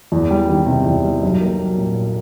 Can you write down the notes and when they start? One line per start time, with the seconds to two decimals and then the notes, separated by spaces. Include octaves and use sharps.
0.12 E2
0.31 G3
0.49 D#3
0.67 C3
0.85 E2
1.04 G3
1.23 B1
1.41 A#3
1.59 F#3
1.78 A#2